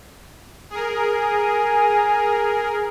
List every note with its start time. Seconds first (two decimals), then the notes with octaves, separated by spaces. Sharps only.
0.70 G#4 A#4
1.15 G#5